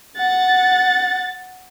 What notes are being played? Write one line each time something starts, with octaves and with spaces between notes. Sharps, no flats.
F#5 A6